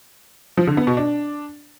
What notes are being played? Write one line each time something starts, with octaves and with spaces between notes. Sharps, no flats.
F3
D3
B3
B2
D4